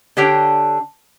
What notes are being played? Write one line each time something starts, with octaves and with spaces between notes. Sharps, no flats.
D3 D4 G4 C#5 G5